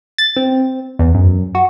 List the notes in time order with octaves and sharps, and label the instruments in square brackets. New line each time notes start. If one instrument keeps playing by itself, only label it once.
[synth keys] A6
C4
E2
F#2
F#4